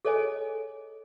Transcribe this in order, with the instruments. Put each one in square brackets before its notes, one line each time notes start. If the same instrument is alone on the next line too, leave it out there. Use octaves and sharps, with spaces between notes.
[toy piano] G#4 A4 C#5 D#5 G#5